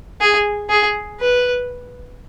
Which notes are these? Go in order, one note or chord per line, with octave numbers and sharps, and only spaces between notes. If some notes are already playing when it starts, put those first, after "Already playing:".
G#4
G#4
B4